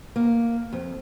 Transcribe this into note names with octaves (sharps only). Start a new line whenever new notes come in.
A#3
F2